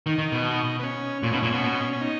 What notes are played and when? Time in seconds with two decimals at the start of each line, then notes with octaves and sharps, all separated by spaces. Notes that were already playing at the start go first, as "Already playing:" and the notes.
0.06 D#3 D#4
0.18 D#3
0.32 B2
0.79 B3
0.83 C#4
1.23 A#2 C#4
1.32 B2 D#4
1.40 A#2 C#4
1.52 B2
1.93 C#4
2.01 D#4